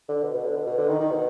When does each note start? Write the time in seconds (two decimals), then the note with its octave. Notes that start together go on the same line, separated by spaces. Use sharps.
0.08 D3
0.23 B2
0.34 B2
0.45 D3
0.56 B2
0.66 B2
0.78 D3
0.89 D#3
1.00 D#3
1.11 B2